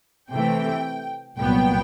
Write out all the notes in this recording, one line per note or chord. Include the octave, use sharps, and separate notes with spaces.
C3 E3 A3 G5
C2 A#2 F#3 B3 G5